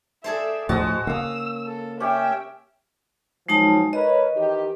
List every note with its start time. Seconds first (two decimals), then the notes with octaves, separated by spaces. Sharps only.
0.24 G#4 A4 C5 D5 E5
0.69 D2 A2 F3 G#3 F#4 C5 A5 D#6
1.07 C#3 A#3 F5 D#6 E6
1.66 A4
2.00 C#4 G4 E5 G5
3.49 A#2 F3 F#3 G#3 D#4 A5
3.93 A#4 B4 C#5 D#5
4.36 D#3 E3 G4